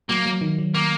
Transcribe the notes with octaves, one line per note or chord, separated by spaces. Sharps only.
F#3 A#3
F#3
D#3
F#3
A#3